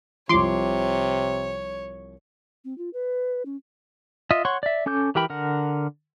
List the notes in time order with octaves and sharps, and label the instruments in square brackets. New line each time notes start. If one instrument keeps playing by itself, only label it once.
[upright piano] C2 F3 [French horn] C3 [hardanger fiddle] C#5 [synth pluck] C6 D6
[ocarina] C4
F4
B4
C#4
[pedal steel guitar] F4 D#5 E5
C#5 F#5 C6 C#6
D5 E5
C#4 A4 D6 G6
E3 G4 A#4 G5 B5
D3 A#4 F#5